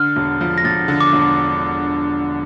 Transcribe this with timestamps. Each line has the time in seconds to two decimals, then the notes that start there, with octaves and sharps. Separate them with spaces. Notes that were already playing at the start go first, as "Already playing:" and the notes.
Already playing: D3 F6
0.16 E1
0.41 F3
0.58 A#6
0.64 E1 A6
0.88 D3
1.01 D6
1.13 E1